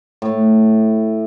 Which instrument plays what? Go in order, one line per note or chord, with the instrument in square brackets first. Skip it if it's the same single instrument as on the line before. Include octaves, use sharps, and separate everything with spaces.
[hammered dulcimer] A2